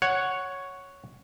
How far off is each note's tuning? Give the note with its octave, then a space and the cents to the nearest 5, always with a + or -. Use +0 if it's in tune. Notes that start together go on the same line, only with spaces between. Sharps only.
C#5 +0 F#5 +0